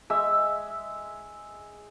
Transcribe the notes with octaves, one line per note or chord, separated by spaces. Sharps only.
G#3 E5 E6